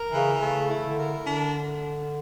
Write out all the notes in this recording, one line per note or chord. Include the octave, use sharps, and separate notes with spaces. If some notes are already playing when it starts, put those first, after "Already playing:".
Already playing: A#4
C#3 E3
C#3 A3
E4
D3
A#4
D3 D4